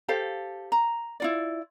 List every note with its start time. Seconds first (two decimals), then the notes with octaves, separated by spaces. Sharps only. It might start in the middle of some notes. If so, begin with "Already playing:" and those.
0.08 G4 A4 C5 F5
0.72 A#5
1.20 E4 F4 D5